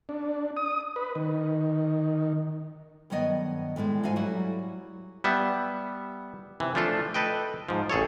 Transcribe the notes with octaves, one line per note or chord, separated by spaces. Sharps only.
D4
D#6
B4
D#3
G2 D#3 F#3 B3 D#5
A2 E3 G3 G#3
G#2 F#4 A4 E5 F5 G#5
F#3 G3 E4 F#4
G3 B3 E5
C3 E3
F3 A3 D4 F4 A4
A4 B4 D#5 G5
G#2 F3
A1 G#4 A4 C#5